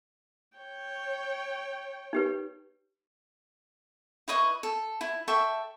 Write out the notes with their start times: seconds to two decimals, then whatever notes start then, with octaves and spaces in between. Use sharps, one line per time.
0.58 C#5 G5
2.13 D#4 G4 B4
4.28 E4 B4 D#5 C#6
4.63 A4
5.01 E4
5.28 A4 E5 G5 C#6